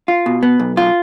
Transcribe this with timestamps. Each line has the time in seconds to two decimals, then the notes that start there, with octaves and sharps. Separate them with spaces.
0.08 F4
0.26 B2
0.43 B3
0.60 B1
0.77 F4